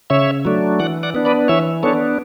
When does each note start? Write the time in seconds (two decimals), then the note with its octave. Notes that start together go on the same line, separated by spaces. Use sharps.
0.10 C#3 C#5 E5
0.45 F#3 A3 D4
0.79 E3 D5 F#5
1.03 D5 F#5
1.15 B3 D4
1.25 B4 D5
1.48 E3 C#5 E5
1.83 B3 D4 A4 C#5